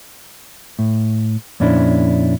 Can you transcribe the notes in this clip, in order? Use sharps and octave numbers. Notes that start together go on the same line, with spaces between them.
A2
F2 A#2 C#4 D4 E4